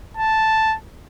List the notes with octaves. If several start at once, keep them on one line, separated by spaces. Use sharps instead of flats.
A5